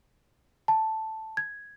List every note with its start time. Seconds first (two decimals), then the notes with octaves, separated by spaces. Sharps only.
0.68 A5
1.37 G#6